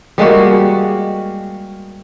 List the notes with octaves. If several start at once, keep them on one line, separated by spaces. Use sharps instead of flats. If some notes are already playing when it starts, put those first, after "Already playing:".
G3 G#3 A#3 F#4